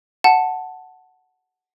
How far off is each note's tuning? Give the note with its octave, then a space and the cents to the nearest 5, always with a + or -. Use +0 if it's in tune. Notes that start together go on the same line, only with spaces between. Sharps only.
F#5 +0 A5 +0